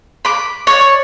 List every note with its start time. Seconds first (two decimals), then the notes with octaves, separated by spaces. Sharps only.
0.25 B5 D6
0.67 C#5 D5